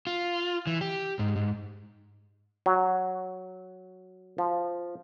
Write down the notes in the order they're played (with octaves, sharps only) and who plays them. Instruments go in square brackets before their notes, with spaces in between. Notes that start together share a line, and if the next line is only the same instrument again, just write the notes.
[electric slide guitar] F4
E3
G4
G#2
G#2
[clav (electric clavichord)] F#3
F3